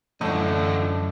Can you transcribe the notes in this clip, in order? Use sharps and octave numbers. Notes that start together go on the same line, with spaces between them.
F#2 A2 D3 E3 F3 D#5